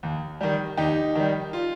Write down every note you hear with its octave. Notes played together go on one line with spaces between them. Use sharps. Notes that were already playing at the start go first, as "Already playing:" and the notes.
D#2
D#3 G3
D#2 D#4 G4
D#3 G3
F4